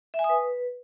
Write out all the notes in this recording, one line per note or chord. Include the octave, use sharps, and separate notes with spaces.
E5
G#5
D#6
B4